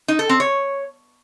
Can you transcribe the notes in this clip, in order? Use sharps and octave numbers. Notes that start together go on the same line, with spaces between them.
D#4
A4
C4
C#5